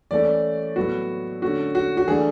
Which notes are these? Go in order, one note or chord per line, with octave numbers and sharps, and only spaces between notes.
E3 A3 C#4 D5
A2 F#3 B3 F#4
D3 A3 C#4 F#4
F#4
F#4
E3 A3 D4 G#4